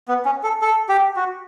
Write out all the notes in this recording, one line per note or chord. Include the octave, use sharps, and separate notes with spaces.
B3
C#4
A4
A4
G4
F#4